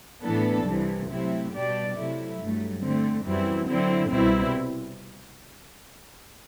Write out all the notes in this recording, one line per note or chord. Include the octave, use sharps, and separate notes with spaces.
A2 E3 B3 D4 A4
C2 C3 E3
C3 F#3 A3 C4 E4
B2 G3 D4 G4 D5
C3 F#3 A3 E4
G2 F#3 A3
D3 A3 C4
F#2 E3 G3 C4 E4
D3 F#3 C4 E4
C2 B2 G3 C4 E4